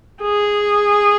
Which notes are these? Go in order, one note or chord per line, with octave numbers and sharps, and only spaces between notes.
G#4